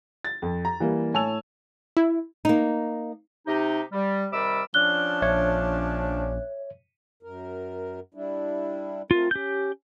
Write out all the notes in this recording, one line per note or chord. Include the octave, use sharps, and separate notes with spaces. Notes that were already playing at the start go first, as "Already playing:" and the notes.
A6
F2
A#5
E3 G3 A#3
A2 C#5 G#5 A5 E6 F7
E4
A#3 D#4
C3 D#4 G4
G3
C3 D#3 G3 B5 D6 E6
F3 C#4 D4 F6 F#6 G7
A#1 C#5 E5
F#2 A#4
G3 D4 E4
A3 C4 F4 A#4
C#4 G4 G6